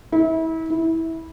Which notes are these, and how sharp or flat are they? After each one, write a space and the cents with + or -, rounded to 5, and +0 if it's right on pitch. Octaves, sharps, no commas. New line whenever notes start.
E4 -35
E4 -20